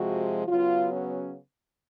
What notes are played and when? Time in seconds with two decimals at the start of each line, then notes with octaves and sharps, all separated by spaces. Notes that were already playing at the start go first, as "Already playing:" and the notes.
Already playing: C3 F3 G#3 F#4
0.47 C#3 F#3 B3 F4
0.92 C#4